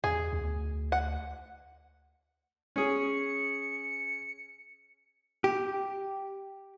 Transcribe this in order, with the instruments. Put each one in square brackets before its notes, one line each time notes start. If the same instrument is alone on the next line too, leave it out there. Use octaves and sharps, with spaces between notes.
[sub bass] E2 [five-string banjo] G#4
[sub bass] D2
[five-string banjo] F#5
[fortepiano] C#4 G#4 [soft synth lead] C#7
[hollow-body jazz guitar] G4